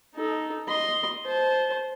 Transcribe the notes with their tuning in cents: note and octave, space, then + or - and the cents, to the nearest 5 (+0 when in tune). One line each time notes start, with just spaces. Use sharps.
D#4 +0 A4 -15
D#5 +0 C6 +0
C5 +0 A5 -25